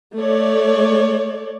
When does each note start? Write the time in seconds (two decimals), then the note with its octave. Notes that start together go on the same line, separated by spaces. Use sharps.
0.17 A3 C#5 D5